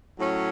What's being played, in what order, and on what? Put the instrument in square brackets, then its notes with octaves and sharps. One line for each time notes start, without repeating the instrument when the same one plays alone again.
[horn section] A2 F#3 C#4